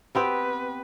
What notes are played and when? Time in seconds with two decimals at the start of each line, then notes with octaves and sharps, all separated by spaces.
0.15 B3 C4 G4 B4